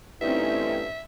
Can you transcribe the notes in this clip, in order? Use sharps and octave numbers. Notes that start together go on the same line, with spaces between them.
E2 G2 A3 C4 C#4 D#4 E4 E5